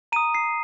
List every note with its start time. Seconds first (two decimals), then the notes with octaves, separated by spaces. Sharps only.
0.12 A#5 D#7
0.16 D#6
0.34 C7